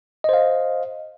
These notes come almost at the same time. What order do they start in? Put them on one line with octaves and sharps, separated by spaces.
D#5 C5 F5